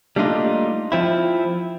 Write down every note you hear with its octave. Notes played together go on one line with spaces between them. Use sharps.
G3 A3 A#3 D4 D#4 F4
F3 C4 E4